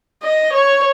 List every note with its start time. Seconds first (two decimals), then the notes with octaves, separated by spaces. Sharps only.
0.23 D#5
0.53 C#5